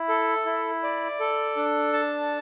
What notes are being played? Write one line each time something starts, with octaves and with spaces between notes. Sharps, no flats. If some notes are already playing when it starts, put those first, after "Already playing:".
Already playing: E4
A4
E4
D5
A4
D4
A5